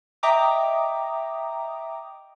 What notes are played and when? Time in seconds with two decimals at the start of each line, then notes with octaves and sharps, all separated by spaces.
0.23 D#5 E5 G5 A#5 D6 D#6